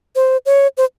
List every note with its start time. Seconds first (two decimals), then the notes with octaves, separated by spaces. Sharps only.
0.16 C5
0.46 C#5
0.77 C5